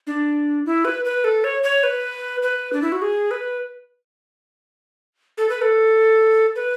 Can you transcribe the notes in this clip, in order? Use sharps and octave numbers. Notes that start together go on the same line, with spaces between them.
D4
E4
B4
B4
A4
C#5
C#5
B4
B4
D4
E4
F#4
G#4
B4
A4
B4
A4
B4